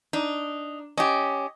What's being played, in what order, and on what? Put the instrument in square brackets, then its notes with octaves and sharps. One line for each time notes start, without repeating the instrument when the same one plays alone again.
[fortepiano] D4 [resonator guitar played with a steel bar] D#4
[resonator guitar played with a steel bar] C#4 G4 [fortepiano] D#5